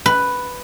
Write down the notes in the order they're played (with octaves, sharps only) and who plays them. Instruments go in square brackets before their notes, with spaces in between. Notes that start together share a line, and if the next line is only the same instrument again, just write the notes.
[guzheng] B4